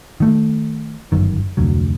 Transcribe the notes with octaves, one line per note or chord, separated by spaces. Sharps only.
D#3 A3
G1 F#2 D#3
F1 D2 F#3